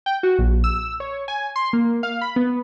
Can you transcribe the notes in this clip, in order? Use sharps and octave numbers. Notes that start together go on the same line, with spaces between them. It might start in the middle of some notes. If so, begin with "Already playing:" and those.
G5
F#4
A#1
E6
C#5
G#5
C6
A#3
F5
B5
B3